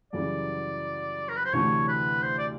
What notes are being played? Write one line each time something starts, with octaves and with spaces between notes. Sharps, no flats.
F#2 C#3 E3 G3 D5
A#4
B4
C5
D2 C3 E3 A3 D4 C#5
B4
C5
D5